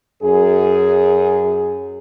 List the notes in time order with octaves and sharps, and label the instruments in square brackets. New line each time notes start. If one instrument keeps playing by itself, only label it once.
[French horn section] F#2 G#4